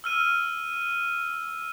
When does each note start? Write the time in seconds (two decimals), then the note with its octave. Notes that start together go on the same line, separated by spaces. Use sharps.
0.04 E6 F6 D#7